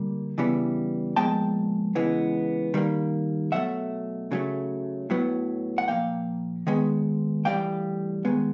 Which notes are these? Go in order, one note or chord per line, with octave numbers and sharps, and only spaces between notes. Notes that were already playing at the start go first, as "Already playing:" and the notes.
Already playing: D3 G3 A#3
C#3 E3 G3 B3
A#2 F3 G#3 B3 G5 A5
C#3 E3 G#3 B3
D#3 G3 A#3
B2 F#3 A3 E5 F#5
C#3 F#3 A3
A2 F#3 B3
F#5
A#2 F3 A#3 F5 G5
D#3 G#3 B3
A2 E3 G3 A#3 F5 G5
D#3 G#3 B3